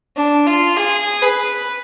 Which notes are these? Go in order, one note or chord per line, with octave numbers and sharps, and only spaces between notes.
D4
F4
G#4
B4